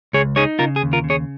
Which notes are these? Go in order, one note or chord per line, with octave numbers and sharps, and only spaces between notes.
C#2 G#4 C#5
D#4 G#4 C#5
C#3 F4 A#4
G#4
D#2
F4 A#4
C#3
G#4 C#5